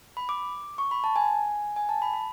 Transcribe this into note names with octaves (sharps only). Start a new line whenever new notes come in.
B5
D6
C#6
B5
A5
G#5
G#5
A5
B5
B5